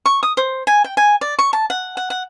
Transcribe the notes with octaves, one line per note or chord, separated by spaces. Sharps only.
C#6
D#6
C5
G#5
G5
G#5
D5
C#6
A5
F#5
F#5
F#5